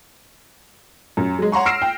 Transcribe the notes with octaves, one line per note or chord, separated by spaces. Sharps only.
F#2
F#3 G#3
C#5 F#5 A#5 C6 C#6
E6 F6 A#6 C7 D7 E7
G5